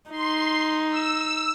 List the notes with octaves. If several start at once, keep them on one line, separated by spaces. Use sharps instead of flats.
D#4 C6
E6